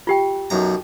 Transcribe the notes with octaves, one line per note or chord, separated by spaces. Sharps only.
F4 G4 G5
B1 F#2 A#5